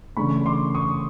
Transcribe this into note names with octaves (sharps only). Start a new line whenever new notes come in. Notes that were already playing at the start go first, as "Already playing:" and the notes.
C#3 E3 A3 D4 B5 C#6
C6 D6
C#6 D#6